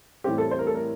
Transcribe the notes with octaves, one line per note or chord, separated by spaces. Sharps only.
A2 E3 G3 C4 G4
A4
C5
A#4
A4
A#4